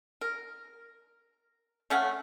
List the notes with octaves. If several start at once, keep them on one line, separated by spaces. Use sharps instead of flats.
A#4
A3 C#4 F5 F#5